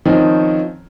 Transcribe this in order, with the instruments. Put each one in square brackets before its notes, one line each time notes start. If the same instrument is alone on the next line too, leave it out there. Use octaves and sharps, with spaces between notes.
[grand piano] D#3 F3 C4 C#4 D#4